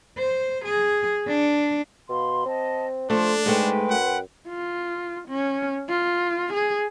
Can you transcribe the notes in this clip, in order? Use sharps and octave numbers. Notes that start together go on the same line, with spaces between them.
C5
G#4
D4
B2 F5 B5 C6
C4 D#5 A5
F3 A3 D4 C6
G#2 G#3 A3 B4 G5 C6
F#2 F#5
F4
C#4
F4
G#4